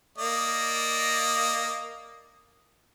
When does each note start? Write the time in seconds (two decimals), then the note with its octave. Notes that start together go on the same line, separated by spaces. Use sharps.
0.18 A#3 D5 D#5